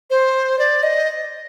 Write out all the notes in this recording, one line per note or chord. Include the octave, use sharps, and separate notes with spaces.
C5
D5
D#5